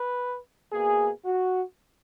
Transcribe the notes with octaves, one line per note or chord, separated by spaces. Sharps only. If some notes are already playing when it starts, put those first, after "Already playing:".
Already playing: B4
B2 A#3 G#4
F#4